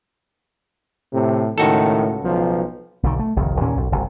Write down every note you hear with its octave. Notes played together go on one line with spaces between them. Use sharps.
A2 C3
C#2 A2 D#3 F#4 A4
B1 F3
B1 D3 D#3
A3
G1 C2 F2 D#3
D#2 A#2 A#3 C#4
B1
F#1 C2